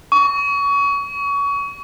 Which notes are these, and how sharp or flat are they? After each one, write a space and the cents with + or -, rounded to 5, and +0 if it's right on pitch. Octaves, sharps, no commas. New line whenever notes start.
C#6 +30